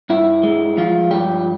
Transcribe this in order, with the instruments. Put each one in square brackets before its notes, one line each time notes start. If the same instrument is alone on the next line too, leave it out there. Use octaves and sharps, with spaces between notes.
[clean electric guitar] G2 E4
G#3
F3 F4
G2 G4